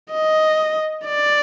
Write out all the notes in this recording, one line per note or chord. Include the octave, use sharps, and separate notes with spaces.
D#5
D5